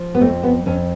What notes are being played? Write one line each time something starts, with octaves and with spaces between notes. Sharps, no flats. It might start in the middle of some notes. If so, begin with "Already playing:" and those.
Already playing: F3
B3
F2 A3
B3
F2 C#4